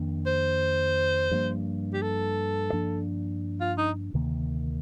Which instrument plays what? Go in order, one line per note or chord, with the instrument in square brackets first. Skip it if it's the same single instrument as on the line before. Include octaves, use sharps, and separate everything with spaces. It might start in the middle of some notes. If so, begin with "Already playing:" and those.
Already playing: [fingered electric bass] F2 D#3 A#3 D4
[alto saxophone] C5
[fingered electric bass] G2 F3 A#3
[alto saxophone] G4
A4
[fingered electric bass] G2 F3 A#3 D4
[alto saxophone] F4
D#4
[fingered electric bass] D2 C3 D#3 A#3